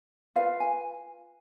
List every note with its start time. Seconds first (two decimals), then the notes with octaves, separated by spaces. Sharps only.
0.36 F4 B4 F5
0.60 G#5